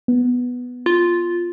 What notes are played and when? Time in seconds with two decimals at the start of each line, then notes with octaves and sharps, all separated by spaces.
0.08 B3
0.86 F4